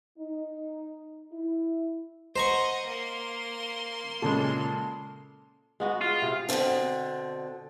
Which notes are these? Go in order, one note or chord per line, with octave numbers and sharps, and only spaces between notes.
D#4
E4
C5 D#5 F#5 A#5 C#6
A#3 C6
A#2 C#3 G#3 A4
G#3 B3 F#4
F4
C3
B2 D3 A#3 C4 D4